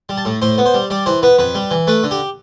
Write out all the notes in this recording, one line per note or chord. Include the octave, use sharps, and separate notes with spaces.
G3
A5
A2
A2 C5
B3
C5
G3
G3 D5
E3 C5
B3 B4
F2 B4
G3
E3
A3 B4
D3
G4